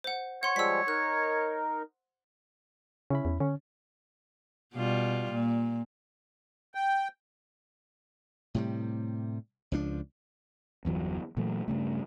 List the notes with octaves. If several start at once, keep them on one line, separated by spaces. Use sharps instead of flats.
C5 F#5
C#5 F#5 C6
F3 G3 G#3 E6 B6
D#4 A#4 F#6
C#3 C#4 E4 B5
E2
D3 C#4
B2 G3 F4
A#2
G5
A2 C3 G3
C#2 F3 D4
G1 E2 E3 F#3
A#2 E3 F#3 A3
G2 C#3 A3